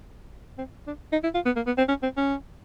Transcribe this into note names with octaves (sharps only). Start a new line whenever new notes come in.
C4
D4
D#4
E4
F4
B3
A#3
B3
C4
C#4
C4
C#4